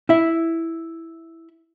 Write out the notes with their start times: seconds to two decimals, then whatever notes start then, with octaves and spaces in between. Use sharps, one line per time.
0.09 E4 E5